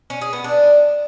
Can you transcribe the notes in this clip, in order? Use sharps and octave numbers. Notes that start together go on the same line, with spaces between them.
C#4
G#4
B3
D4